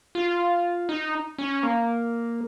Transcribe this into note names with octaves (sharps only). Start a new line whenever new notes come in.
F4
D#4
C#4
A#3